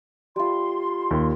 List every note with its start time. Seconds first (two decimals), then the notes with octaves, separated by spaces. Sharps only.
0.36 G3 F4 C6
1.11 D#2